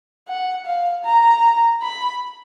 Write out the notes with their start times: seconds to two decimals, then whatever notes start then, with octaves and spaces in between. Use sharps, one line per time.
0.28 F#5
0.66 F5
1.05 A#5
1.82 B5